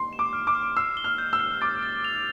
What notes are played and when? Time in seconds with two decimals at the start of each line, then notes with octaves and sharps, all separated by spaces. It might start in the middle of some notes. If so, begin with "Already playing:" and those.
Already playing: C6
0.13 E7
0.19 D6
0.33 F6
0.47 D6
0.55 F6
0.77 E6 C7
0.97 G7
1.04 F6
1.18 G6
1.33 E6
1.40 C7
1.61 D6 A6
1.83 A6
2.04 F7